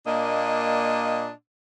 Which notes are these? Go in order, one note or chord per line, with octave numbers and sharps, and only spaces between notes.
A#2 A#3 D4 D#5